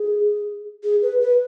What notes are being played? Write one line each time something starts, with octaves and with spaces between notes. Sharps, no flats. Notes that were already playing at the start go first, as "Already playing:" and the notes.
Already playing: G#4
G#4
B4
B4